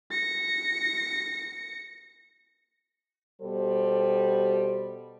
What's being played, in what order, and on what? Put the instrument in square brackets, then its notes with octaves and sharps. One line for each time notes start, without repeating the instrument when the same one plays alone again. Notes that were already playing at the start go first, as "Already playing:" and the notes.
[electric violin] A#6 C#7
[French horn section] B2 G3 A4 C5